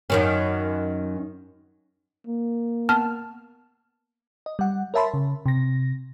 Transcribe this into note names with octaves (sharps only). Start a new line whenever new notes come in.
F#2 D#3 C#4
A#3
B3 A5 F6
D#5
G3 F#5
A#4 C#5 E5 A5 B5 C6
C#3
C3 A#6